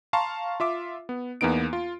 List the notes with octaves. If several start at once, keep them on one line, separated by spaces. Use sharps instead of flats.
F5 A5 A#5 C6 C#6
F4 E5 D6
B3
E2 A#3 B3 D#4 D7
F4